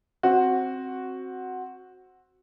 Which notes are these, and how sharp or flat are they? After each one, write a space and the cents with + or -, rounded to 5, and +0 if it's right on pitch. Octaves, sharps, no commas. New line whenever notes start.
C4 +10 F#4 +0